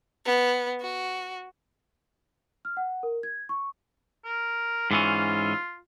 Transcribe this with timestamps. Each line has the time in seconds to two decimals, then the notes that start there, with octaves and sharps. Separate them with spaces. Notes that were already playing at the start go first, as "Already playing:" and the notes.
0.25 B3
0.81 F#4
2.65 F6
2.77 F#5
3.03 A#4
3.23 G#6
3.49 C#6
4.24 A#4
4.91 G#2 E3 C#4 F4